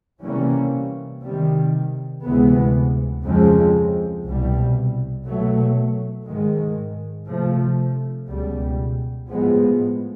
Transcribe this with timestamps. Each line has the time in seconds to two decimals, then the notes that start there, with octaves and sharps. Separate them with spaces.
0.23 C3 E3 G3 A#3 C#4
1.23 C3 D#3 G3
2.24 D2 C3 E3 G#3 B3
3.24 F2 C#3 F3 G#3 C4
4.25 C2 B2 G3
5.26 B2 F#3 A3
6.26 G#2 D#3 G#3
7.27 C3 F3 A3
8.28 C#2 B2 G3
9.29 A2 F3 G#3 B3